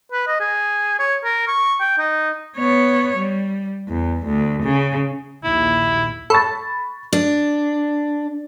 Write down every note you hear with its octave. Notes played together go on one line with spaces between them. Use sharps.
B4
D#5
G#4
C#5
A#4
C#6
G5
D#4
B3 C#5
G3
E2
D2
C#3
A#1 D#2 E4
A4 B5 C#6 A6
D4